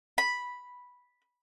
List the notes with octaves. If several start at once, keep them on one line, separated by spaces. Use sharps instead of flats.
B5